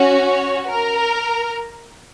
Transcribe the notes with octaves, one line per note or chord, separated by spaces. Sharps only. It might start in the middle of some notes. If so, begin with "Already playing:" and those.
Already playing: C#4 F#4
C#5
A#4